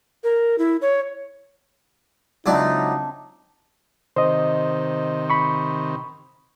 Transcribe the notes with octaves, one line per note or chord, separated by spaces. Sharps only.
A#4
E4
C#5
C#2 F#3 C4 D4 D#4 D5 E5
C3 D#3 C5 D#5
B5 C#6